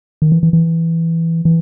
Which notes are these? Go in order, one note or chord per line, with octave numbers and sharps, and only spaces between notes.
D#3
E3
E3
E3
E3